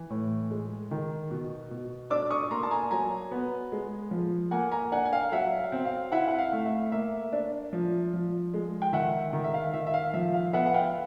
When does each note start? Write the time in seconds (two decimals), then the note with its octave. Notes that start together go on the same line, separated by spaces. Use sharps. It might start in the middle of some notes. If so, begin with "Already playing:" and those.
Already playing: E3
0.10 A2
0.51 G#3
0.91 D#3
1.31 B2
1.71 B2
2.10 D4 D6 E6
2.31 C#6 D#6
2.51 A#3 A#5 C6
2.63 A5
2.71 G#5 A#5
2.91 F#3 G#5 A#5
3.31 B3
3.72 G#3
4.11 F3
4.51 A#3 F#5 G#5
4.71 G#5 A#5
4.92 D4 F#5 G#5
5.05 G#5
5.12 F5 G5
5.32 F#3 E5 F#5
5.59 F5
5.72 C4
5.85 F5
6.12 E4 E5 F#5
6.28 F#5
6.38 F5
6.52 A3
6.65 E5
6.92 A#3 E5
7.33 D4
7.73 F3
8.13 F3
8.54 G#3
8.82 G5
8.93 D#3 E5 F#5
9.33 D#3
9.44 E5
9.54 F5
9.73 D#3 E5
9.87 E5
9.94 F5
10.14 F3 E5
10.34 F5
10.53 B3 E5 F#5
10.66 F#5
10.74 F5 G5